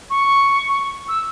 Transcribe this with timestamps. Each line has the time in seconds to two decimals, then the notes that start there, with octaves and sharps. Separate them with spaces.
0.10 C#6
1.08 E6